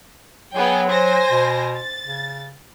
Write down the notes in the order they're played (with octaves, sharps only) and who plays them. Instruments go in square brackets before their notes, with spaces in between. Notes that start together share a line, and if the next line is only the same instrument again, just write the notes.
[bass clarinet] F#3 [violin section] B3 G#4 G5
[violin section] C5 G#5 A#6
[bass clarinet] B2
[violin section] A6
[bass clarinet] C#3